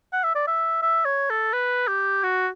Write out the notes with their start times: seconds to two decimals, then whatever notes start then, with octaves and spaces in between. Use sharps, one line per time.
0.13 F#5
0.24 E5
0.35 D5
0.47 E5
0.82 E5
1.05 C#5
1.30 A4
1.53 B4
1.88 G4
2.24 F#4